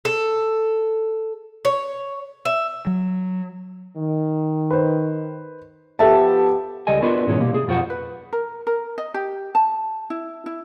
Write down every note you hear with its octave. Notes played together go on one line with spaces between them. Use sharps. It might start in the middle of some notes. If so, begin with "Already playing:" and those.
A4
C#5
E5
F#3
D#3
B4 C5
F3 B3 G4 A4 E5 A5
C#2 G3 A4 D#5 G#5
B3 D4 F4 F#4 A#4 B4
G#2 B2 E3 G#3 C#4 F#4
B2 G3 A#3
C3 G#4
B1 F2 F4 F#4 C5 F#5
B4
A#4
A#4
D#5
G4
A5
E4
E4